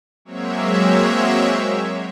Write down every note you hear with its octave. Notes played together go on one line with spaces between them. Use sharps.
F#3 G#3 A#3 C4 C#5 E5